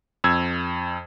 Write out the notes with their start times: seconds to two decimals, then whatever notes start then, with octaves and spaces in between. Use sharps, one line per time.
0.24 F2 E6 G#6